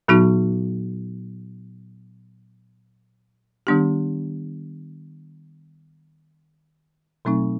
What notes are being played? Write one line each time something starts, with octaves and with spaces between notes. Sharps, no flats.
A#2 F#3 B3 D#4 F#4
D#3 G3 B3 D4 G4
B2 F#3 A3 C4 D#4